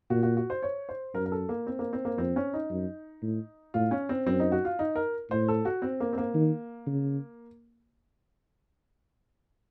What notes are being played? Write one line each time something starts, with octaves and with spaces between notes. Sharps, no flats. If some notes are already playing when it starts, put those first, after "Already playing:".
A#2 F#4
F#4
F#4
C5
C#5
C5
F#2 A#4
A#4
A4
A#3
C4
A#3
C4
A#3
F2 C4
C#4
D#4
F#2
A2
A2 F4
C#4
C4
F#2 C4
D#4
F#4
F4
D#4
A#4
A2 C5
A4
F#4
C4
A#3
C4
A#3
D#3
C#3